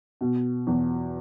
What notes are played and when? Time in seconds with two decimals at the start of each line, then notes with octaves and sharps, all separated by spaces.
0.21 B2
0.67 E2